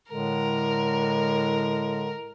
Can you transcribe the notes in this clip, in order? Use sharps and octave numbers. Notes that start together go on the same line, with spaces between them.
A2 D3 G#3 A#4